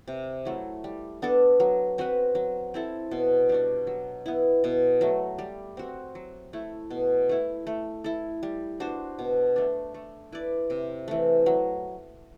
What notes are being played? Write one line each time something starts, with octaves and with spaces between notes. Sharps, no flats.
C3
F#3 A3 E4
G3
B3 D4 A4
F#3
C4 F#4 B4
F#3
C4 E4 A4
B2
G3 D4 F#4
F#3
B3 E4
B2
F#3 A3
G3
C4 F#4
F#3
A3 E4
B2
A3 E4
A3
E4 A4
G3
D4 F#4 C5
B2
A3 D4
A3
E4 B4 D5
C3
E3 A3
F#3